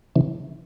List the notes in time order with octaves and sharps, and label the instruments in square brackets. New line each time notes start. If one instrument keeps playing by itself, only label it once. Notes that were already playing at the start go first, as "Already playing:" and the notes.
[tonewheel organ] C#3 E3